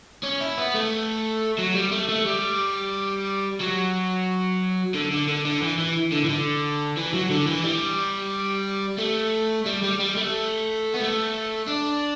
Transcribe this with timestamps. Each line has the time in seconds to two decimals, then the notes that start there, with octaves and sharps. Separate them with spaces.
0.24 C#4
0.41 E4
0.58 B3
0.74 A3
1.59 F#3
1.75 G3
1.92 A3
2.09 A3
2.26 G3
3.60 F#3
4.95 D3
5.11 D3
5.29 D3
5.45 D3
5.62 E3
5.78 E3
6.12 D3
6.25 E3
6.29 D3
6.97 E3
7.14 F#3
7.30 D3
7.47 E3
7.64 G3
8.99 A3
9.66 G3
9.83 G3
9.99 G3
10.16 A3
10.94 B3
11.00 A3
11.68 D4